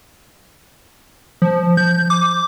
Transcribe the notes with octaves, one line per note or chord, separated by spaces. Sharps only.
F3
G6
D6